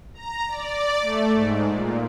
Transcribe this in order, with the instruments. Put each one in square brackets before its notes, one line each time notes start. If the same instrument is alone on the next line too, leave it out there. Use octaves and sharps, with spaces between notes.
[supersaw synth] A#5
D5
A3
G#2
A#2